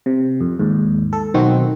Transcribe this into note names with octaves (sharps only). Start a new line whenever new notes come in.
C3
F2
D#2 G#2
A4
B1 D#3 C4 F#4